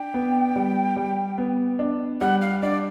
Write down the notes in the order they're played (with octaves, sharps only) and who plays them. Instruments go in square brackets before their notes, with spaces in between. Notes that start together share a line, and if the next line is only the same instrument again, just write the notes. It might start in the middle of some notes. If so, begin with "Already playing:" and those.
Already playing: [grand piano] D4 [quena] G5
[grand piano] B3
G3
G3
B3
D4
[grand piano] G3 [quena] F#5
[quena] F5
[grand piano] D4 [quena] D5